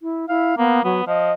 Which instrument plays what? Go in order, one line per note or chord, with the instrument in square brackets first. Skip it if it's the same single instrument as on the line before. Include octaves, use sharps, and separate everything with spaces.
[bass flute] E4
[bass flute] E4 [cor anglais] F5
[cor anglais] A#3 [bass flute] B3
[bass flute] F#3 [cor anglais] B3
[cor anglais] F3 [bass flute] D#5